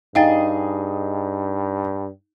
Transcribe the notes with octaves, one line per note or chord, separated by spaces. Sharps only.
G2 D#4 G#4 D#5 F5 G5 A6